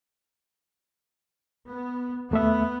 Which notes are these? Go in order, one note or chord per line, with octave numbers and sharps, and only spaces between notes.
B3
D#2 A3 B3 E5